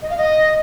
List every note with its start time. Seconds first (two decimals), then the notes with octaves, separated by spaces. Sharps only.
0.02 D#5
0.09 F5
0.17 D#5